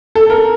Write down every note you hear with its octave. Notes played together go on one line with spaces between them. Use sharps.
A4
A#4